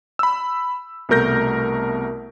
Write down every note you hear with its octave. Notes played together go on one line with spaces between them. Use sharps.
B5 E6
C2 B2 A3 A#4 G6 A#6